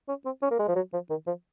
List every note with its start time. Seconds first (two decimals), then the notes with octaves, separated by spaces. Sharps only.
0.08 C#4
0.25 C4
0.42 C#4
0.51 A#3
0.59 G#3
0.68 F3
0.76 F#3
0.93 F3
1.10 D#3
1.27 F3